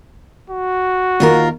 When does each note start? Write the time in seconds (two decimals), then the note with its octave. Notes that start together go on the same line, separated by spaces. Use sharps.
0.50 F#4
1.20 D#2 F4 A#4